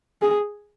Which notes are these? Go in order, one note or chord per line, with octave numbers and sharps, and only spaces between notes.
G#4